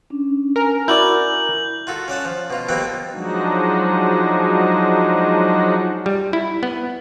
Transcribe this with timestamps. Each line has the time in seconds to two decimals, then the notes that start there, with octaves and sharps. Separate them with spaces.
0.10 C#4 D4
0.56 A#4 G#5
0.88 E4 F#4 D5 G6 F#7
1.87 F4 F#4 A4
2.08 C#4 D5 F#5 A5
2.25 F3
2.50 B2 F4
2.69 B2 F3 G3 A#3 C4 F#5
3.13 F3 F#3 G#3 D4 D#4 F#4
6.06 G3
6.33 E4
6.63 B3